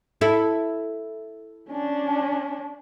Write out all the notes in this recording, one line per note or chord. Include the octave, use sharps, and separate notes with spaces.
E4 A4
C#4 D4